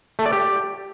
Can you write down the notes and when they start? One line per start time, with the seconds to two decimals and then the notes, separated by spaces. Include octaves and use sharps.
0.19 A3
0.26 D5
0.33 G4